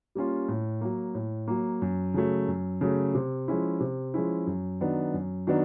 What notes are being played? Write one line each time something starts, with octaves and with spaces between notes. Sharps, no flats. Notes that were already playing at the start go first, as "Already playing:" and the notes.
G3 A#3 C#4 F4
A2
F#3 A#3
A2
F#3 A#3
F#2
C#3 F#3 A3
F#2
C#3 F#3 A3
C3
F3 G#3 C#4 E4
C3
F3 G#3 C#4 E4
F#2
D#3 F#3 B3 D4
F#2
D#3 F#3 B3 D4